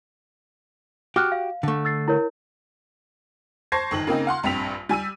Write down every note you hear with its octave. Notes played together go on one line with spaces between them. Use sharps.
F#4 G4 D6 F6 F#6
F5
D3 A3
E6 A6 C7
E4 A#4 C#5
C5 A5 C#6 G#6 A#6 C7
G1 D#3 F#7
C#3 A#3 C4 D#4
F5 F#5 C6
A#1 G2 C4 B6 F7
G3 G#5 E6 D#7